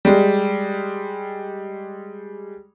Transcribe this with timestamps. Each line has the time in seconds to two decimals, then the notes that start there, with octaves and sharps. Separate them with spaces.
0.05 G3 G#3